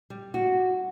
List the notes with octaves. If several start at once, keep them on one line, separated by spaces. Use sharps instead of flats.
G3
F#4